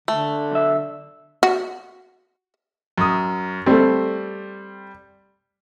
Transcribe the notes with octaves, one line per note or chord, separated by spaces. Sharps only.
D3 A3
B1 E5
F#4
F#2 D#6
G3 A3 C4